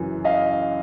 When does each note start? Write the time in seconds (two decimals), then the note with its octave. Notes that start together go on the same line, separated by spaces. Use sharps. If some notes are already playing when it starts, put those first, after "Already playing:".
Already playing: F#2 C#3 E3
0.24 D#5 F5